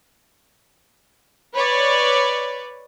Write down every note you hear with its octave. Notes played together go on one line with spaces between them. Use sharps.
B4 C#5 D5